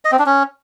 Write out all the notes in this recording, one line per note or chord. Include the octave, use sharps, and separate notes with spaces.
D#5
C4
D4
C#4